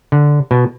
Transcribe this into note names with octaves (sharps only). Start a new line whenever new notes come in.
D3
B2